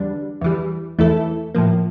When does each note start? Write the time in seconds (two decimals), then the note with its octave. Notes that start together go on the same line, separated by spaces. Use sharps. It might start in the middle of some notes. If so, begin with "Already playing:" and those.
Already playing: E2 D3 G3 D4
0.41 E2 E3 G3
0.99 E2 E3 A3 E4 A4
1.55 A2 F3 A#3